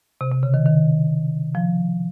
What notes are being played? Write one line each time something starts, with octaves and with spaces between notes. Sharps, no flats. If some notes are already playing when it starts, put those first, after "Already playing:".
C3
C3
C#3
D#3
D#3
F3